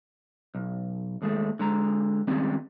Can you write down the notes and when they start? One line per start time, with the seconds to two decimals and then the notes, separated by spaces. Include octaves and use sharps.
0.55 B1
1.22 D#2 G#3 A3
1.59 D3 G#3 A#5
2.27 D#3 G3 G#3 C4 C#4